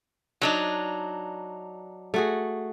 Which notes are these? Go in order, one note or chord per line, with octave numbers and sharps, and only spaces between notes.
F#3 D4 D#4
A3 F#4 G#4